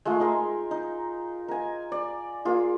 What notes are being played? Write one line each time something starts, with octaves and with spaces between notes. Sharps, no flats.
G#3 A3 F4
D#4 G#4 A#4 G#5
D#4
A#4 G#5
D5
A#3 F4 G#4